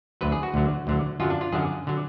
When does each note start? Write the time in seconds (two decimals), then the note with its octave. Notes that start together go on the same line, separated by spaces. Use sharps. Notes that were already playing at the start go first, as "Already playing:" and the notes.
0.21 D2 D3 F#3 B4
0.32 G#4
0.43 F#4
0.54 D2 D3 F#3
0.87 D2 D3 F#3
1.20 F#2 D3 F#3 F4
1.30 D4
1.41 F4
1.52 F#2 D3 F#3 G#4
1.87 D3 F#3